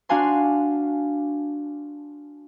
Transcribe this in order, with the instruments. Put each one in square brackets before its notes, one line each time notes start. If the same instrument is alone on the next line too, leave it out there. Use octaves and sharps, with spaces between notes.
[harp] D4 F#4 F5 G#5 C6